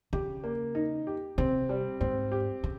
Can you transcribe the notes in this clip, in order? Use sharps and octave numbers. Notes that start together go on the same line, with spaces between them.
C#3 G4
A#3
D#4
G4
C3 C4
G3
G#2 C4
G4
C#3